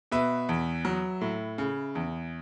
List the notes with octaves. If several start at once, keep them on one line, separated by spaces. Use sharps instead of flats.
B2 B4 E5
E2
F#3
A2
C#3
E2